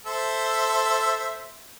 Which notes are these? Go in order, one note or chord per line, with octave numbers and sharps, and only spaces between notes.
A4 C5 E5